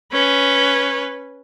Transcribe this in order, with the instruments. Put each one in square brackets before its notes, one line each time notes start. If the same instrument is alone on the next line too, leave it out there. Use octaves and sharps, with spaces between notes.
[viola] C#4 B4